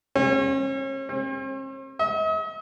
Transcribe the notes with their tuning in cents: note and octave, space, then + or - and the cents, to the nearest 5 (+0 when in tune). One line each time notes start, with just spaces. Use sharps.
C#4 -40
C4 +45
D#5 +45